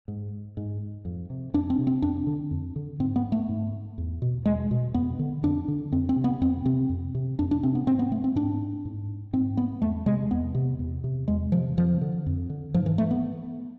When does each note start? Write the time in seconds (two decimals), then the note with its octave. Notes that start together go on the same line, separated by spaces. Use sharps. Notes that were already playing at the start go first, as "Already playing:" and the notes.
0.08 G#2
0.57 G#2
1.05 F2
1.30 C3
1.54 F2 D4
1.70 C4
1.78 C3
1.87 C4
2.02 F2 D4
2.27 D3
2.51 F2
2.76 D3
3.00 G#2 C4
3.16 B3
3.32 A3
3.49 G#2
3.98 E2
4.22 B2
4.46 E2 G#3
4.71 B2
4.94 F2 B3
5.19 D3
5.43 F2 D4
5.68 D3
5.92 F2 C4
6.09 C4
6.16 C3
6.24 B3
6.41 F2 C4
6.65 C3 C4
6.89 F2
7.15 C3
7.39 F2 D4
7.51 D4
7.63 C3 C4
7.75 B3
7.87 G#2 C4
7.99 B3
8.12 A3
8.24 C4
8.35 G#2 D4
8.85 G#2
9.33 G#2 C4
9.57 B3
9.82 E2 A3
10.06 C3 G#3
10.31 E2 B3
10.55 C3
10.79 E2
11.04 C3
11.28 E2 G#3
11.52 C3 F3
11.77 F2 F3
12.01 D3
12.26 F2
12.50 D3
12.74 G#2 F3
12.86 E3
12.98 A3
13.11 B3